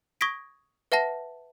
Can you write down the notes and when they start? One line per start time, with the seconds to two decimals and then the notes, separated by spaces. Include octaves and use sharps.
0.21 C#6 D#6 G#6 A#6 B6 D7
0.92 B4 E5 F#5 A5 A#6